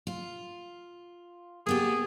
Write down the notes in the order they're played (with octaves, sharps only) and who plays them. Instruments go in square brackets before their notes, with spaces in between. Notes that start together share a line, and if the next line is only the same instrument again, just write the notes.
[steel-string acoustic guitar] F4
[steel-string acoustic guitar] A#3 B3 G4 [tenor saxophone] G#4